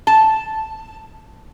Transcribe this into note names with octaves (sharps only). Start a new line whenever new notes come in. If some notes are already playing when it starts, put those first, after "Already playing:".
A5